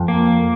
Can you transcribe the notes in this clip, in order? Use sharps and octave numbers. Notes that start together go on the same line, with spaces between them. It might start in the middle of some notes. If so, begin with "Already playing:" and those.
Already playing: F2
A#3